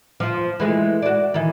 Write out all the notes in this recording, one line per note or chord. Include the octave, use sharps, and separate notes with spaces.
F3 F4
E3 G#3 A3
F#4 D5
D#3 E3